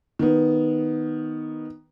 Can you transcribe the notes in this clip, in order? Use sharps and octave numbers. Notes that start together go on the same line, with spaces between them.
D#3 B3